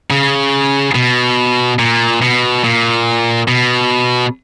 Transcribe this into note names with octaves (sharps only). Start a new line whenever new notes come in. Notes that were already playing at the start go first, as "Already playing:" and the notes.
C#3
B2
A#2
B2
A#2
B2